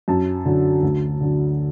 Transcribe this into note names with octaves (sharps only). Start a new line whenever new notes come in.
F#2 A5
D3 F#3
D2
D3 F#3